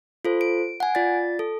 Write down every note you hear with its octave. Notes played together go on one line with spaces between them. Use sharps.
F4 A4 C5
D7
F#5 G#5
F4 D5 A6
A4